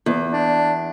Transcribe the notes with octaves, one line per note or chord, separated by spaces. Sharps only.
E2
D4